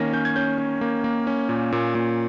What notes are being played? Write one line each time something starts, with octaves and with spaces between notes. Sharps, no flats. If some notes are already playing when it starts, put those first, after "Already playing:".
Already playing: D#3 A#3 C#4 A#6
C#4 G6
G#6
C#4 G6
C#4
A#3
A#3
C#4
A#2
A#2
A#2